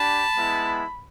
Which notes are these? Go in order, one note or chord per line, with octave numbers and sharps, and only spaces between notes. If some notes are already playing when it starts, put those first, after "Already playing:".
Already playing: D4 G4 A5 B5
G#3 B3 E4